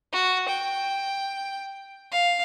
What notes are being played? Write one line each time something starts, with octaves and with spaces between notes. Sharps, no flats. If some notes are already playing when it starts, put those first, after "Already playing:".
F#4
G5
F5